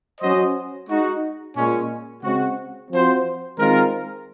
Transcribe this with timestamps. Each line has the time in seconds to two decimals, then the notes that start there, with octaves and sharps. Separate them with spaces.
0.20 F#3 C#4 F#4 C5 D#5
0.88 G#3 D#4 F#4
1.56 A#2 G#3 C#4
2.23 C#3 G#3 C4 F#4
2.91 F3 C4 F#4 C5
3.58 D#3 G#3 C4 F4 A#4